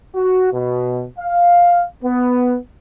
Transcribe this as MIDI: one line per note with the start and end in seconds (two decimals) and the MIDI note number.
0.15 0.49 66
0.52 1.04 47
1.18 1.84 77
2.03 2.56 59